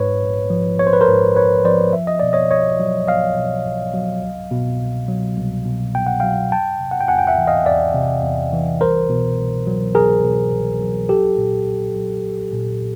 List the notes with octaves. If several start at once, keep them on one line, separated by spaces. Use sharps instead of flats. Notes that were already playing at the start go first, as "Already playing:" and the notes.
Already playing: A#1 G#2 B4 C#5
A#1
F3
A#1 C#5
C5
B4
A#4 C5
G#2
A#1 B4 C#5
F3 C5 D5
B1 E5
D#5
B2 D5
C#5 D#5
B1 C#5 D#5
F#3
B1 D#5 F5
B2
B1
F#3
C2
B2
C2
F#3
C2
B2
C2 G5
F#5
F#3 F5 G5
E2 G5 A5
C3
F#5
G5
E2 F#5 G#5
G5
E5 F#5
E3
D#5 F5
E2 D5 E5
C3
E2
E3
C2 A#4 C5
B2
C2
F#3
C2 G#4 A#4
B2
C2
F#3
A#1 G4 A4
A#2
A#1
F#3
A#1
A#2